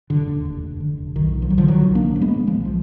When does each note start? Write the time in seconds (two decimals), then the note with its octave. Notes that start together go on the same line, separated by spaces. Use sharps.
0.10 F1 D3
0.27 D#2
0.45 F1
0.63 F1
0.80 D3
0.98 F1
1.15 B1 D#3
1.34 A#2
1.42 F3
1.50 B1 F#3
1.58 D3 F3
1.68 B1 D#3 F#3
1.86 B1
1.95 A#3 D4
2.04 A#2
2.16 A#3
2.21 A#2 G#3 B3
2.39 A#2
2.47 F3 G#3
2.57 B1
2.65 F3